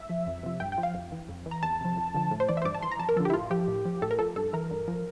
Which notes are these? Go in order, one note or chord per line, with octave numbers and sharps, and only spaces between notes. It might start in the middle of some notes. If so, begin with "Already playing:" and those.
Already playing: E5
F3
F2
C3 F3
G2 G5
G5
F3
F5
F2
E3
F2
E3
A#5
E2 A5
C3 F3
F2
D3 F3
A2
C5
E3 D5
E5
C5
G2 D5
A5
E3 C6
A#5
F2 A5
A#4
D3 F3 A4
G4
E4
A2 F4
F3 G4
A2
F3
A2 A4
A#4
F3 A4
G2 A4
E3 A#4
G2
F3